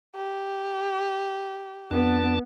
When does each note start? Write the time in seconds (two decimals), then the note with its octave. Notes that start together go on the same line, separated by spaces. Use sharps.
0.16 G4
1.91 F2 B3 D4 A5